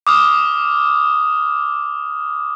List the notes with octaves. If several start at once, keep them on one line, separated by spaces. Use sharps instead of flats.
D6 D#6 F6